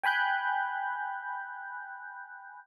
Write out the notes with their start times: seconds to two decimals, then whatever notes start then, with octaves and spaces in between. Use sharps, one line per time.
0.03 G5 G#5 B5 F#6 G6